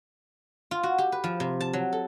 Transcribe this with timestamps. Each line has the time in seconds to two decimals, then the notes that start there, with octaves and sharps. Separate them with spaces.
0.71 F4
0.83 F#4
0.98 G4
1.12 B4
1.24 F3
1.40 C3
1.60 A5
1.73 F#3
1.93 A4